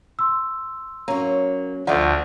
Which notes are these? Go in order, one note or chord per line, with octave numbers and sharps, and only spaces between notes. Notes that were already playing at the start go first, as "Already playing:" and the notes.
C6 E6
F#3 A#3 C#4
D2 F3 A3 D5 F#5